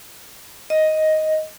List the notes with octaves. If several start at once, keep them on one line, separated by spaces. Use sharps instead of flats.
D#5